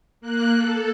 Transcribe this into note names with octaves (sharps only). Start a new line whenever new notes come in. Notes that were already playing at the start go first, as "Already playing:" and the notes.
A#3 F#6
A4